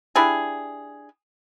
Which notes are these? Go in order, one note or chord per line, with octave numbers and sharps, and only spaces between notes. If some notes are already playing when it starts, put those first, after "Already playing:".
D4 E4 G4 G#4